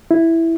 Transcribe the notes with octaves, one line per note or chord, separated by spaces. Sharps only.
E4